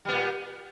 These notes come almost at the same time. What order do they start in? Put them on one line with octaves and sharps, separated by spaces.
G3 B3 A#2